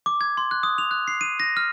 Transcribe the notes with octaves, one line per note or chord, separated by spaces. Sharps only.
D6
G#6
C6
F#6
D#6
F7
F#6
C7
D#7
A#6
F6